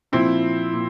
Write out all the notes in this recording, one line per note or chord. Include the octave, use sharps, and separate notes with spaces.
A#2 F3 C4 E4
A#2